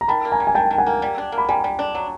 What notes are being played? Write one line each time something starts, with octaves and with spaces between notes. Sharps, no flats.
A#5
D#3 A5 B5
A#3
G#5 A#5
G3
G#5
D#3 G5 A5
D#3
F#5 G#5
A#3
G3
D4
A#3
B5
G3 G#5 A#5
G3
D4
F#3